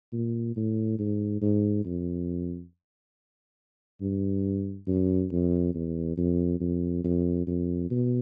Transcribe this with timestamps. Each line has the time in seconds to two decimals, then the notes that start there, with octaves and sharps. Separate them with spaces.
0.13 A#2
0.56 A2
0.99 G#2
1.41 G#2
1.85 F2
4.01 G2
4.87 F#2
5.32 F2
5.75 E2
6.17 F2
6.60 F2
7.04 F2
7.47 F2
7.91 B2